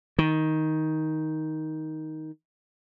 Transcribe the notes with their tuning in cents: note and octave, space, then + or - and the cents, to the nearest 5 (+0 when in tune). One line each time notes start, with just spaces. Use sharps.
D#3 +10